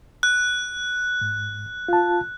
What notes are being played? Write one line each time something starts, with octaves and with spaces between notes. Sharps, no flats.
F#6
G#2
F4 A5